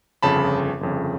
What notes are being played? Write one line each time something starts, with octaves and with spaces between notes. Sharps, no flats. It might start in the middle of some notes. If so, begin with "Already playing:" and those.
G1 F2 C#3 A5 B5
G1 F2 C#3